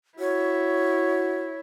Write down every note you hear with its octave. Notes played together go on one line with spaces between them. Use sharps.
E4 F#4 C#5